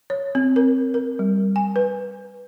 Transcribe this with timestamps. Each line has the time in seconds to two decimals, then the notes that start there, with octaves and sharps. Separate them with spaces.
0.10 C#5
0.35 C4
0.56 A#4
0.94 A#4
1.19 G3
1.56 G#5
1.76 B4